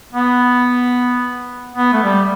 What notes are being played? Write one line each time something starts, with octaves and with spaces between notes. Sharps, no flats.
B3
B3
A3
G3